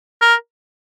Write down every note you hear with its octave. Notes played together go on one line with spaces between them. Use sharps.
A#4